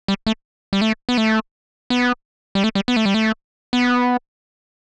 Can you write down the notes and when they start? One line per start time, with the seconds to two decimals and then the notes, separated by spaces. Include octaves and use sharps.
0.08 G3
0.27 A3
0.73 G3
0.81 A3
1.09 B3
1.18 A3
1.90 B3
2.55 G3
2.64 A3
2.75 G3
2.88 B3
2.96 A3
3.06 G3
3.14 A3
3.73 B3